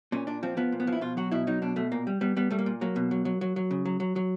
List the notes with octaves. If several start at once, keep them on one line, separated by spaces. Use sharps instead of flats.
A#2 C#4
A#2 D4
F3 C4
F3 B3
A#2
B3
F3
E4
B2 F4
F#3 F#4
B2 E4
F#3 D#4
B2 D4
B2 A3
A#2 A#3
G3
G3 B3
G3 B3
G3 A3
A#3
A#2
F#3 A#3
B2
F#3
F#3
F#3
F#3
C#3
F#3
F#3
F#3